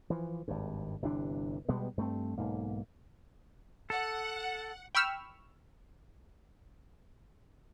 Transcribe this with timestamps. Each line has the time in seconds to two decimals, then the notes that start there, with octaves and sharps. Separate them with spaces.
0.10 E3 F3
0.48 G#1 G2
1.02 G1 C3 E3 D4
1.69 B2 G3 G#3 B3
1.97 G2 A3 C4
2.38 B1 G#2 A#3
3.90 A4 F#5
4.95 G5 B5 C#6 E6 F6